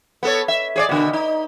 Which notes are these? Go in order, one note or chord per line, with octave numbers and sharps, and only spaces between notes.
B3 A4 C#5
E5
G#4 C#5 D5
B2 D3
D#4